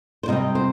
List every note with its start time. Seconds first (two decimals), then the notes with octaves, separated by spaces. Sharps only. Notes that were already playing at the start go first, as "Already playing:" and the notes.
0.23 C5
0.28 C3 G3 C4 D#5
0.55 C5